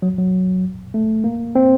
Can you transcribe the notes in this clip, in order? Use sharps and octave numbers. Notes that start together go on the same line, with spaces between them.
F#3
F#3
A3
A#3
C4